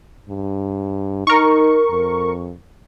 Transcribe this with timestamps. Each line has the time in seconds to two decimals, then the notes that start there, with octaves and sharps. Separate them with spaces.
0.30 G2
1.27 D#4 A#4 C#6
1.91 F2